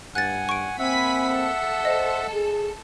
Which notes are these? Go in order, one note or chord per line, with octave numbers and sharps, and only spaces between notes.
G2 F#5 G#5 F#6 A6
C#6 D7
A#3 C4 E5 F#5 G#5 B5 B6
A4
C5 D#5
G#4